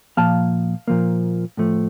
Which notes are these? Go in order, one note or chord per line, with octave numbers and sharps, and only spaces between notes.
A#2 F3 A#3 F5 A5
A#2 F3 A#3
A2 F3 A3